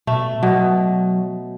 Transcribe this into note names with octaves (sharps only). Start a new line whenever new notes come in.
B2 A3
B2 F#3